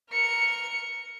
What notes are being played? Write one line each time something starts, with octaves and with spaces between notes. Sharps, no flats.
A#4 C#7